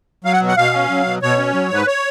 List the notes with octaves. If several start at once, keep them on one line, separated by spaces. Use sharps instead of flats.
F#3 F5
F#5
B2
F#5
B2 F5
C#4
F#3
B2
B2 C#5
C#4
F#3
G#2 B4
C#5